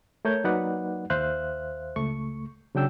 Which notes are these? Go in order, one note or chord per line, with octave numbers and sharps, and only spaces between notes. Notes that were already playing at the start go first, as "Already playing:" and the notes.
A3 A#4 C#5 G6
F#3 A#3 D#4 B4 D5 F#5
D#2 C5 E5 F5 F#6
C#2 A3 C#6
C#3 F#3 D4 G5 E6